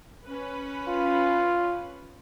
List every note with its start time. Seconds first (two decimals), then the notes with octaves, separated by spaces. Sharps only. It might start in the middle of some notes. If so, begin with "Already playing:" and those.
0.24 C#4 B4
0.88 F4